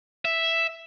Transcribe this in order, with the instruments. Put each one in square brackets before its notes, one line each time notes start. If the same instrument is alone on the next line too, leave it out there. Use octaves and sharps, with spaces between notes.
[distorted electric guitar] E5